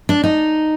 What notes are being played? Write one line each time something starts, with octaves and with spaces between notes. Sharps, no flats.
D4
D#4